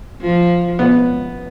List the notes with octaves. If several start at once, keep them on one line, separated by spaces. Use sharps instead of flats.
F3
B3